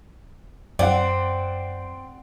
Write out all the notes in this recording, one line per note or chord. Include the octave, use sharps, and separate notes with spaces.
F#2 C4 D5 F#5